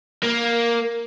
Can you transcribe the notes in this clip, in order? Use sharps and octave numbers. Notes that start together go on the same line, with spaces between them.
A#3